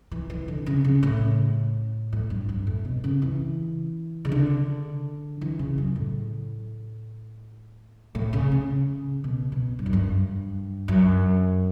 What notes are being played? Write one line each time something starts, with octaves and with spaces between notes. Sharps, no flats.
E3
E3
D3
C#3
C#3
A2
A2
G2
G2
A2
B2
C#3
E3
C#3
D3
E3
C#3
F#2
A2
A2
C#3
C#3
B2
B2
G2
F#2
G2
F#2